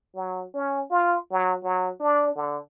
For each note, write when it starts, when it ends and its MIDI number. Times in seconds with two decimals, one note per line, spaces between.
0.15 0.45 54
0.54 0.83 61
0.91 1.16 65
1.31 1.57 54
1.63 1.91 54
2.00 2.34 62
2.36 2.57 50